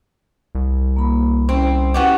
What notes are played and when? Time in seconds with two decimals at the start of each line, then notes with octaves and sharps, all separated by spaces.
0.55 C2
0.96 A#3 B5
1.49 C4 C#4 E4
1.94 B3 C#4 E4 F#4 G4